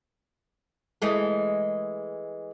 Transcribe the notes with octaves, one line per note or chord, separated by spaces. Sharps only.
E3 G#3 A3